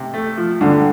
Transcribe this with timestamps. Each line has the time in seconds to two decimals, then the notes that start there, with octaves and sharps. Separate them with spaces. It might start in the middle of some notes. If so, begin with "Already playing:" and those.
Already playing: C3
0.14 A3
0.37 F3
0.61 G2 D3